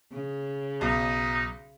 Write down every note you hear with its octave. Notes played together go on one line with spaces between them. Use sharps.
C#3
B1 D#4